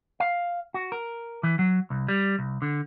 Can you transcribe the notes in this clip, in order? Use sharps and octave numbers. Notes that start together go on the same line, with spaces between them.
F5
F#4
A#4
E3
F#3
C2
G3
C2
D3